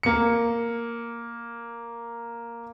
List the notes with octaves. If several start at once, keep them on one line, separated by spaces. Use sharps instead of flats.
A#3 C#7